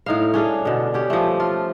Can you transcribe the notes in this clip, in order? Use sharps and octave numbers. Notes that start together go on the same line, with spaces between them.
A2 D#4 F5
C#4 D4 G#4
B2 D3
C#4 G4
F3 A3
F4